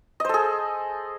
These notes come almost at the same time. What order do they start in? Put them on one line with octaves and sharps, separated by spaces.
D#5 C5 A4 G#4